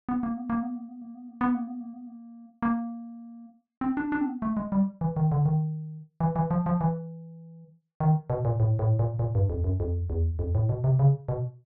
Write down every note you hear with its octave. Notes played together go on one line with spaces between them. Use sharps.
B3
A#3
B3
A#3
B3
A#3
B3
A#3
B3
A#3
B3
A#3
B3
A#3
B3
A#3
A#3
C4
D4
D4
C4
B3
A3
G#3
G3
E3
D#3
D3
D#3
E3
E3
F3
F3
E3
D#3
B2
A#2
A2
A2
A#2
A#2
G2
F2
F#2
F2
E2
F2
A2
B2
C3
C#3
B2